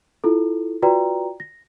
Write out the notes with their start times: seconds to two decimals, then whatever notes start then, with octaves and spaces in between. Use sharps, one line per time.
0.24 E4 F4 A4
0.82 F4 F#4 B4 D5 G5 A#5
1.40 A#6